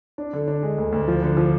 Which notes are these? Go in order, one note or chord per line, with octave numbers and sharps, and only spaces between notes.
D4
D3
D4
G#3
D2
D2
F3
D3
F3